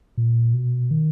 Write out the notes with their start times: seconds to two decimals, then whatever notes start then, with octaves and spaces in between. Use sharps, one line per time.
0.18 A#2
0.54 B2
0.91 D#3